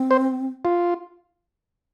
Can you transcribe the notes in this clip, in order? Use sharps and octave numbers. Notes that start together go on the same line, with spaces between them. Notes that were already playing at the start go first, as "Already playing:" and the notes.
Already playing: C4
C5
F4